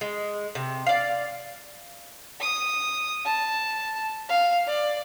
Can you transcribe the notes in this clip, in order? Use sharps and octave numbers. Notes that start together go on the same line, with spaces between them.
G#3
C3
D5 F5
D#6
A5
F5
D5